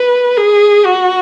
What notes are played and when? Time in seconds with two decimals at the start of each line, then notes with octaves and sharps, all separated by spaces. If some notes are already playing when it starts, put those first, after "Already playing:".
Already playing: B4
0.37 G#4
0.85 F#4